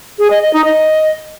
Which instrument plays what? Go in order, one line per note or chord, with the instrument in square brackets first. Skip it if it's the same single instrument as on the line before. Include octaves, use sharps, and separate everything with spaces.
[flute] G#4
D#5
D#5
D#4
D#5